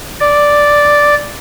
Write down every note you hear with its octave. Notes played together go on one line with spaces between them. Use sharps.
D5